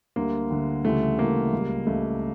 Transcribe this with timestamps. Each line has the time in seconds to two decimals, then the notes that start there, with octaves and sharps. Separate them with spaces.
0.16 D2 D3 G3 A#3
0.50 D2 D3 G3
0.85 D2 C#3 E3 G3 A3
1.18 D2 C#3 E3 G3 A#3
1.53 C#2 C#3 G3
1.86 C#2 C#3 G3 A3